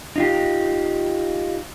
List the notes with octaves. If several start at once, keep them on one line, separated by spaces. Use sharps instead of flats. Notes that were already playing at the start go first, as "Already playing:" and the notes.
D#4 F4 G4